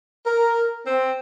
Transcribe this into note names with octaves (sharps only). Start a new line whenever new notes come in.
A#4
C4